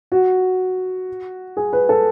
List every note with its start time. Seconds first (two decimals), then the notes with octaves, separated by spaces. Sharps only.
0.12 F#4
1.57 G#4
1.73 B4
1.89 A4